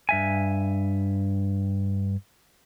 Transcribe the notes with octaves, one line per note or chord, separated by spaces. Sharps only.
G2 E5 G#5